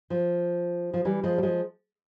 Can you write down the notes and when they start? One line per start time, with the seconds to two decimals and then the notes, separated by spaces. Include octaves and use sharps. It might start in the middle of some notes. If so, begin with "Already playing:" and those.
0.10 F3
0.94 F3
1.05 E3 G3
1.24 F3 G#3
1.38 G3
1.43 F3 G#3